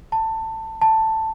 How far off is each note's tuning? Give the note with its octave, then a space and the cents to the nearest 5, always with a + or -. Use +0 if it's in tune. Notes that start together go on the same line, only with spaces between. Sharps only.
A5 +20
A5 +10